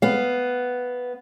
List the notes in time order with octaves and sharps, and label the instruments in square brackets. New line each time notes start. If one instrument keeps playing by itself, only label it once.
[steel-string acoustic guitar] B3 F5